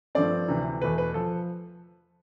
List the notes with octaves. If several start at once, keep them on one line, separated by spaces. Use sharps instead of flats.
G2 F3 A3 C4 D5
D2 C3 E3
E2 B2 A3 B4
B4
F3 A4